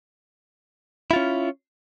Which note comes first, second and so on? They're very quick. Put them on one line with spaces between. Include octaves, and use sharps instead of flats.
E4 F4 C#4